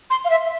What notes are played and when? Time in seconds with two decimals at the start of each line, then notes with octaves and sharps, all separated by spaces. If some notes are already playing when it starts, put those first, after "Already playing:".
0.10 C6
0.25 F5
0.30 E5